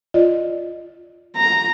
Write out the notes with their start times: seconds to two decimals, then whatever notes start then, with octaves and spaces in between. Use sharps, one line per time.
0.14 F4 D5 D#5
1.37 A#5